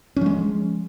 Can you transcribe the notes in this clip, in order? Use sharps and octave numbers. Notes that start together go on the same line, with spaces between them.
F3 G#3 C#4